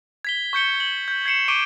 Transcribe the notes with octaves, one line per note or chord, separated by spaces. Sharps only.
G#6 B6 G7
C#6 G6 C#7 G7
F#7
G6
G#6 C7 C#7 E7
C#6 D6 D7 D#7 G7